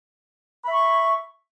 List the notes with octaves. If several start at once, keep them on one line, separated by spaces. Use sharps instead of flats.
E5 B5 C#6